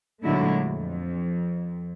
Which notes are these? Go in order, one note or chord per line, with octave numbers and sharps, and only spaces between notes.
A#2 D3 F#3 G#3 A3 E4
F2